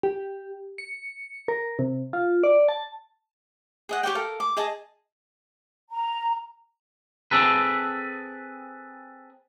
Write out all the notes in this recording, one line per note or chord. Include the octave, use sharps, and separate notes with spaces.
G4
C#7
A#4
C3
F4
D5
A5
G#4 D#5 F#5
G4 C#5 D5 G5
A4 A#4 F5
D6
G#4 D#5 A5
A#5
C4 G#4 A4 B4